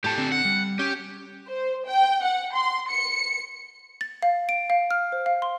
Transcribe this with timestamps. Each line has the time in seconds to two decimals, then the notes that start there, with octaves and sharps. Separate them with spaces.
0.04 A2 G4 A4 A5
0.17 D3 C4
0.32 F#5
0.45 G3
0.79 C#4 G4
1.47 C5
1.86 G5
2.22 F#5
2.55 C6
2.90 C#7
4.01 A6
4.22 F5
4.49 D7
4.70 F5
4.91 F6
5.12 C5
5.26 F5
5.42 C6